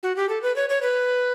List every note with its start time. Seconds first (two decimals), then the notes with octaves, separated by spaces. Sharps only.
0.03 F#4
0.16 G4
0.29 A4
0.43 B4
0.56 C#5
0.69 C#5
0.82 B4